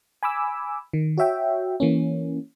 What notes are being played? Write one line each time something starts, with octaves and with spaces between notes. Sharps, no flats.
G#5 B5 D6 E6
D#3
F#4 C#5 E5 G5
E3 A#3 C#4